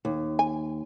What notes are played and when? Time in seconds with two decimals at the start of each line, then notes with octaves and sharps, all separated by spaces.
0.05 D#2
0.39 G#5